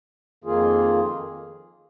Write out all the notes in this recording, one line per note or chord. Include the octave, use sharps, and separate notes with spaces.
F2 D#3 A#3 F4 G#4